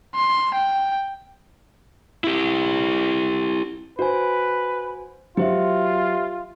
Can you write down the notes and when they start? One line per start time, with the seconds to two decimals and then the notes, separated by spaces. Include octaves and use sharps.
0.15 C6
0.54 G5
2.24 E4 G4
3.99 F#4 B4 C5 G#5
5.37 F#3 F4 G4 C5 E5